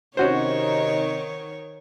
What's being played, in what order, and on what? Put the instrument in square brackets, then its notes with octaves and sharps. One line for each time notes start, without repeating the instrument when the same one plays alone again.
[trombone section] C3 D#4 [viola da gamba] D#3 C#5 [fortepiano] C#4 F#4 C5